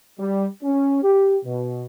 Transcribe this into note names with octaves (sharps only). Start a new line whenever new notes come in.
G3
C#4
G4
B2